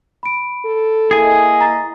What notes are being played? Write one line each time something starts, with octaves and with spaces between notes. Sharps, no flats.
B5 D7
A4
A#3 E4 G#4 D#5 G#5
A#5 A6